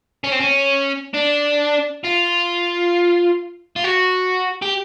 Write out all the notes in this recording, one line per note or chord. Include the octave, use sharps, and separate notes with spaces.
C#4
C4
C#4
D4
F4
F4
F#4
G4